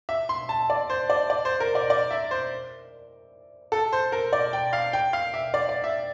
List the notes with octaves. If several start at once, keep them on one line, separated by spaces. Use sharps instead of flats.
E5
C6
A5
D5
C5
D5
D5
C5
A#4
D5
D5
E5
C5
A4
C5
A#4
D5
G5
F5
G5
F5
E5
D5
D5
E5